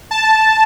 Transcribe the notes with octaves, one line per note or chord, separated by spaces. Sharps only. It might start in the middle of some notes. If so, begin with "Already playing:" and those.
A5